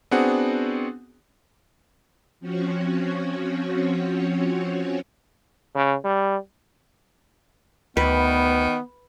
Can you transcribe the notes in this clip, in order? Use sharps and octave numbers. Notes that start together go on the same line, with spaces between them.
B3 C4 D4 F#4 G#4 F#5
F3 C4 C#4 F#4 C#5
C#3
G3
D2 D#3 B3 B4